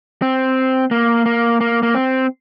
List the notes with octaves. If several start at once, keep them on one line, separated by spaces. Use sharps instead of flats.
C4
A#3
A#3
A#3
A#3
C4